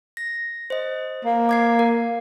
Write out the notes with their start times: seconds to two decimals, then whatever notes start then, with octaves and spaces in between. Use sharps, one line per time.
0.17 A#6
0.70 C5 D#5
1.25 A#3
1.49 D6 G#6 C7
1.79 A#4